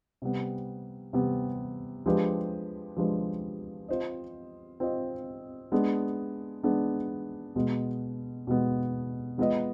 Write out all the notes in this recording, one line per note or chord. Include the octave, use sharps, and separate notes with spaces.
C3 G3 B3
C3 G3 B3
F3 G#3 D4 G4 B4
F3 G#3 D4 G4 B4
C4 F4 C5 D#5
C4 F4 C5 D#5
G#3 B3 D4 G#4
G#3 B3 D4 G#4
B2 G#3 B3
B2 G#3 B3
G#3 B3 F4 B4 D#5